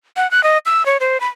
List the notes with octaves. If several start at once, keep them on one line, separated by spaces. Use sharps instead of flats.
F#5
F#6
D#5
E6
C#5
C5
B5